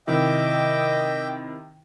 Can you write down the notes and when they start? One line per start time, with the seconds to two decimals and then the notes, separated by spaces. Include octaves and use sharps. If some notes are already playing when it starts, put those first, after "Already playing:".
0.07 C3 D#3 E4 D#5 E5 G5 D6